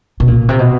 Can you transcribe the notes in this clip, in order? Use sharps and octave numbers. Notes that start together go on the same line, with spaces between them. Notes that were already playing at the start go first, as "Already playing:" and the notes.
B2
A#2
C3
B2